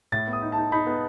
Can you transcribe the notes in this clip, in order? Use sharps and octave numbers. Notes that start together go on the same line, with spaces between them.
A2 A6
B3
D#6
D#4
A5
D#4
D#4 B5
B3